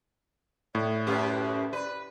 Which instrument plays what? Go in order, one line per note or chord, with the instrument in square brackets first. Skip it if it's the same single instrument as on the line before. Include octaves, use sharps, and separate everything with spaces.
[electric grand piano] A2 [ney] D5
[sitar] F#2 E4 G4 [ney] B4
[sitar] B4 [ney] D5